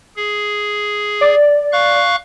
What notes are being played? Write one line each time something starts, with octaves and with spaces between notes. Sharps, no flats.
G#4
D5
F5 C#6 F#6